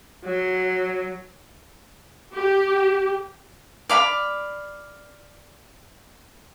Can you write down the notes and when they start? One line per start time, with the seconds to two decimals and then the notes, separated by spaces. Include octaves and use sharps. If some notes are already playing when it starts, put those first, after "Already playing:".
0.25 F#3
2.35 G4
3.89 D5 F5 B5